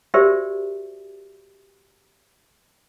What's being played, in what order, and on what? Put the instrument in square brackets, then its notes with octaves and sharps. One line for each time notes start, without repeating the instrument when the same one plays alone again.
[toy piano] F#4 G4 A#4 C5 D5 E5